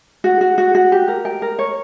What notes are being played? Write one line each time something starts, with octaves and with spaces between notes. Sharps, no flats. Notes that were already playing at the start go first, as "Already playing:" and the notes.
F#4
F#4
F#4
F#4
G4
A#4
G5
A#4
C#5